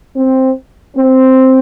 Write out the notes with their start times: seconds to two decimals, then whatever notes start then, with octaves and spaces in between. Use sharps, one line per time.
0.16 C4
0.96 C4